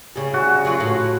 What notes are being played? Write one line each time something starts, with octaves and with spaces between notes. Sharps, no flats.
C#3 G3
F#4
F#3 F4
A2